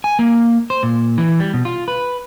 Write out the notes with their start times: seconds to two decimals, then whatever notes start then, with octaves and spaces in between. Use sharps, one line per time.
0.04 G#5
0.19 A#3
0.70 C5
0.83 A#2
1.18 E3
1.40 G3
1.54 B2
1.65 F4
1.88 B4